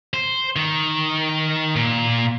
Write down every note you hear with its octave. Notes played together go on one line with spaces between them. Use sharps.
C5
D#3
A#2